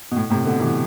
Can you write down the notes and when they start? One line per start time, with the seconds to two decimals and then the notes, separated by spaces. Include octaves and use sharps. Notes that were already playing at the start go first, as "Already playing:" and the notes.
0.11 B2
0.16 A2
0.30 A2 C3
0.45 B2 D3
0.60 C3 E3